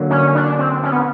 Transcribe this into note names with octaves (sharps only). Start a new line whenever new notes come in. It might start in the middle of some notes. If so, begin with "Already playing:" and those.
Already playing: D3 F#3 A#3
C#4
D4
C4
C#4
B3